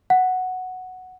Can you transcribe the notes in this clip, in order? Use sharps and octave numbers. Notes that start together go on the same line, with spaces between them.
F#5